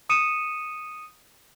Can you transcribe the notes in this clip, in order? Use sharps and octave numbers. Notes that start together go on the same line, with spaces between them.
D#6 C#7 D#7 E7